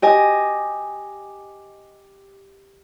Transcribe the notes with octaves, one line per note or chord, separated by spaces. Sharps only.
G4 D#5 G#5